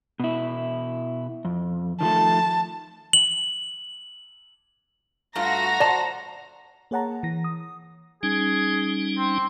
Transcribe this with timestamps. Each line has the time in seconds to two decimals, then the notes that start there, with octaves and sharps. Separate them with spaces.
0.20 B2 E4
1.45 F2
2.01 D#3 F3 A3 A5
3.13 F#7
5.35 G2 A3 F4 F#4 A#5 A#6
5.80 C5 D5 A5
6.91 A#3 G#4 C#5 F#5 A5 A#5
7.23 E3 A#6
7.44 D#6
8.23 G3 C#4 D#4 G#4
9.17 C4